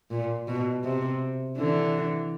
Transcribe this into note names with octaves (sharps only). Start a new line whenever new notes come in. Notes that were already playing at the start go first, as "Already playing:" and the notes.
A#2
B2
C3
D3 E3